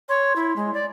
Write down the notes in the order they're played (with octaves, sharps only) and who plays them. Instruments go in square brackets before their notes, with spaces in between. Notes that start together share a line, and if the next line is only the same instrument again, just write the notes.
[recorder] C#5 [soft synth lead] C6
[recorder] E4
G#3
D5